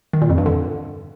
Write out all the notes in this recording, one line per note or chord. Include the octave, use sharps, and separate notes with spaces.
D#3
A#2
F2
G2
D3